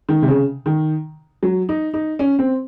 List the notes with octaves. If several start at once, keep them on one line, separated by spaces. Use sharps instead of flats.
D#3
C3
C#3
D#3
F#3
D#4
D#4
C#4
C4